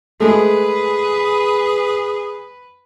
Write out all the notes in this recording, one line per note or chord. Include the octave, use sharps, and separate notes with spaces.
G#3 A3 G#4 B4